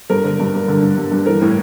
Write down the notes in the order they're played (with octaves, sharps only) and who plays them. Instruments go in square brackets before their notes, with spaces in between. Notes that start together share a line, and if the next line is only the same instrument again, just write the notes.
[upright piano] G2 A#4
D3
G2
G2
D3
G2
G2
G2
E3 A#4
A2